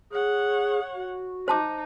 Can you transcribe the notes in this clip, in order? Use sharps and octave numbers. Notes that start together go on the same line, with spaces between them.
G#4 C#5 F#5
F#4
D#4 C5 A5 D6